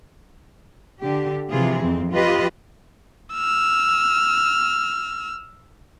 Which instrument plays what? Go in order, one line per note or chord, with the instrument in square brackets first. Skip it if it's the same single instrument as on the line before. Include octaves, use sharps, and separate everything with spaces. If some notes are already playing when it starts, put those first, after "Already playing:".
[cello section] D3 G4
C3 E3 F3 F4 G#4
F2 C4
F3 F4 G4 B4 D#5
[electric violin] E6 F6